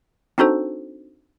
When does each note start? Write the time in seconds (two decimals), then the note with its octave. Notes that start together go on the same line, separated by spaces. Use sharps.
0.38 C4 D4 D#4 F#4 A4 C5